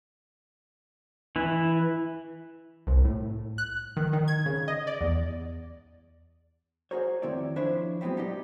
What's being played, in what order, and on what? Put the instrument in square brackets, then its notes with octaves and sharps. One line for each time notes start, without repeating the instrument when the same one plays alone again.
[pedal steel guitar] E3 E4
[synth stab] C2
A2
F#6
D#3
D#3
G#6
C#3
D#5
D5
E2
[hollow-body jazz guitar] F#4 G#4 A#4 C5 C#5
F2 D#3 C4 E4 C#5 D5
F3 D4 E4 C5 C#5
F#3 G#3 B3 C4 E4
D#4 G4 D5 D#5